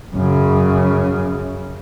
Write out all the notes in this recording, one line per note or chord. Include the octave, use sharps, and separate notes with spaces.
F#2 C#3